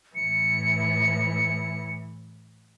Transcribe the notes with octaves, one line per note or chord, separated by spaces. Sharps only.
A2 E3 C#7